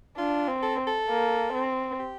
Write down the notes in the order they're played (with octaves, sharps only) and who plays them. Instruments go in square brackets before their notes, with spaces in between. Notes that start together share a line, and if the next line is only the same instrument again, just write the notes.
[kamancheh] D4 [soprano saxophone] F4
[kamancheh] C4
[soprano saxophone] A4
A4
[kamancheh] A#3
C4
[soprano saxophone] G4